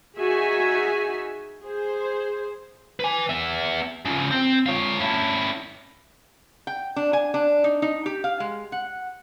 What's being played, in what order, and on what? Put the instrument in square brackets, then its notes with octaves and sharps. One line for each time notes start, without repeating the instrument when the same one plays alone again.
[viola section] D#4 F#4 G#4 E5 G#5
G#4 C5
[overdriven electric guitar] B4 G#5
B3 E5
C#3 F3
C4
F4 C#5
C#4 E4
[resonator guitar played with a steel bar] G5
D4
G#5
D4
D#4
D#4
G4
F5
G#3
F#5